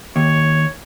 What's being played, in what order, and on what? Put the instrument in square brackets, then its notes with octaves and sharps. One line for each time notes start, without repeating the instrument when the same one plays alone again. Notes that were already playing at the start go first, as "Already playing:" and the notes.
[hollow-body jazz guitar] D#2 [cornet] C#5